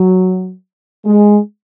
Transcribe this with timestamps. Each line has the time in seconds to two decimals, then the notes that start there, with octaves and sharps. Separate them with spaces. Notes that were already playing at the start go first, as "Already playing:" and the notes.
Already playing: F#3
1.05 G#3